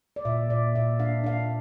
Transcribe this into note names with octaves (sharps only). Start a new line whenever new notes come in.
D5
A#2 E5
A#2 D5
A#2 E5
D4 F5
D4 F5